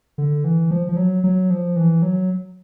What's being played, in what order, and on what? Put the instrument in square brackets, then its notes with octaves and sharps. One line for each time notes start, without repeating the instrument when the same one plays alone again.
[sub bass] D3
E3
F3
F3
F#3
F#3
F3
E3
F#3